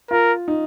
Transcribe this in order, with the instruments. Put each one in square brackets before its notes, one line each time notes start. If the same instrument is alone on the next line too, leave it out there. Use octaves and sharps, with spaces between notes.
[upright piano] F4 [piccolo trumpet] A#4
[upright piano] D#4